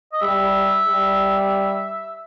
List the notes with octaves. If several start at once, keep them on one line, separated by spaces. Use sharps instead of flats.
D#5
G3 E5
G3